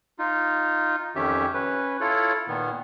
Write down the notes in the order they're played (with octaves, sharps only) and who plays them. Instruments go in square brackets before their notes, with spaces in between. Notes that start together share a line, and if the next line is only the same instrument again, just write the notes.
[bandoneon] D#4 F4
F2 D#3 C#4 G4 E5
C#4 B4
E4 F4 A4 C#5
A#2 D#3 B3